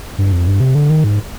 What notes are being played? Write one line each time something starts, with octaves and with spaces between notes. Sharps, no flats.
G2
F2
G2
C3
D3
D#3
G#2